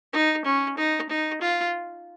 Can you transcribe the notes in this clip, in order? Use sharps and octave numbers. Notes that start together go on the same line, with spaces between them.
D#4
C#4
D#4
D#4
F4